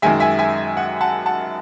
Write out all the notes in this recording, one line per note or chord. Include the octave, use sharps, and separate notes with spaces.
F#2 D#3 G#3 E5 G#5
E5 G#5
E5 G#5
F#5
F#5 A5
F#5 A5